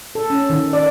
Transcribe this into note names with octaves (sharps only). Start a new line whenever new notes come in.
A4
C#4
D#3
D5